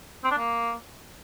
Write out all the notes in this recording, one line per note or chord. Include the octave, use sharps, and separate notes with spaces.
C4
D4
A#3